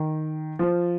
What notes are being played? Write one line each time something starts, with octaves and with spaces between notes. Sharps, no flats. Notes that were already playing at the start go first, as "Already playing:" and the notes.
Already playing: D#3
F3